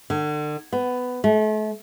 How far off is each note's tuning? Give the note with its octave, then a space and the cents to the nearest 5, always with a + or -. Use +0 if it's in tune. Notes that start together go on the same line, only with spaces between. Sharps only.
D3 +40
B3 +15
A3 -40